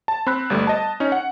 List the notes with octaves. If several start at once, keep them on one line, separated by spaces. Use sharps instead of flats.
A5
C4 B5 F#6
G1 G3 A3
D#5 A5
C#4 D#4
F#5